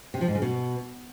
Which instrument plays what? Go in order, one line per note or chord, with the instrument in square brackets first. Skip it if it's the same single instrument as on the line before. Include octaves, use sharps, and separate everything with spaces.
[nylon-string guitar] C3
F3
G#2
C#3
B2